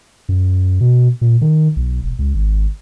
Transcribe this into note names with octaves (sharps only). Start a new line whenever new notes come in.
F#2
B2
A#2
D#3
B1
E1
C#2
G#1